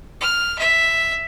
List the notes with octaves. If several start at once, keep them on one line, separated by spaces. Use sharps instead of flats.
F6
E5